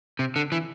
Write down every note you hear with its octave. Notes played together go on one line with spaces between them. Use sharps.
C3
D3
E3